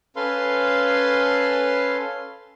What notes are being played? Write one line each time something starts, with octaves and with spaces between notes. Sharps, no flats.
C#4 A4 B4 F5 C6